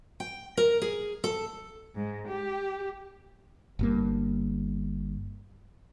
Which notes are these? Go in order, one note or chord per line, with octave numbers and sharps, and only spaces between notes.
G5
A#4
G#4
A4
G#2
G4
G1 G2 A#3